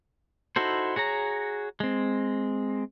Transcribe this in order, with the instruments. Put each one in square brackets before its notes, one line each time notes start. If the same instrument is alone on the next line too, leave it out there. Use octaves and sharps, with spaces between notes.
[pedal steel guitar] D#4 E4 F#4 A4 C5
F#4 G#4 C#5 A#5
G#3 C4